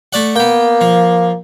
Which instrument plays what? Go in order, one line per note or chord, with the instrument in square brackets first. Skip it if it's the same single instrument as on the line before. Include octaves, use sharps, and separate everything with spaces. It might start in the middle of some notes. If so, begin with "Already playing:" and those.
[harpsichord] A3 D5 F#5
[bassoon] A#3 [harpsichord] B3 G5
[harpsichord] F3